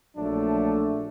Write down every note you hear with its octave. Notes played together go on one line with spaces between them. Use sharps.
A#1 F#3 A3 D4